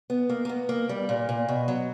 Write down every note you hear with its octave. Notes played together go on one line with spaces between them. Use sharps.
B3
A#3
A#3
B3
A#3
G3
A#2
A#2
B2
F#3